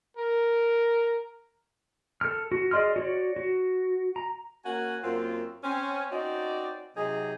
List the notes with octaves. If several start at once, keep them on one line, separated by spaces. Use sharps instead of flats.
A#4
A4 F6
F#4
G#4 D5 D#5 C6 F6
F#4 C#5 D5
F#4
A#5
A#3 C#4 F#4 F#5 G#5
F#2 A#3 C4 F4
C4 C#4
C4 C#4 D#4 F#4 D5
C3 F#3 D#4 G#4